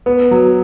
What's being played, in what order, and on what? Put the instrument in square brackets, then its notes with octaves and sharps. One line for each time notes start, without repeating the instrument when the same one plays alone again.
[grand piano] B3
F#3